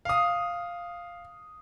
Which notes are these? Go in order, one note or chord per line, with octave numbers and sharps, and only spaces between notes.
F5 D#6